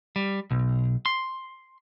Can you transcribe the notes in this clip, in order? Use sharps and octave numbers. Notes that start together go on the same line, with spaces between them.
G3
B1
C6